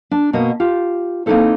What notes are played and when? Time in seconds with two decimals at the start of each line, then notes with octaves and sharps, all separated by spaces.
0.11 D4
0.33 B2 A#3 F#4 D#5
0.60 F4 G4
1.26 A#3 C4 D#4 E4 A4 C5